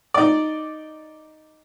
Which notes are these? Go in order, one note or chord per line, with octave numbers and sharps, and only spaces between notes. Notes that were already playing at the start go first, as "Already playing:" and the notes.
D#4 D5